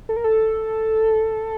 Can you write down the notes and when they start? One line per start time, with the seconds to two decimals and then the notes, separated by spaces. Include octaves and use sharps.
0.09 A4
0.17 A#4
0.24 A4